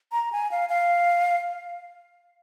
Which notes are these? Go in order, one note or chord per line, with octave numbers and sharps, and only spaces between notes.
A#5
G#5
F5
F5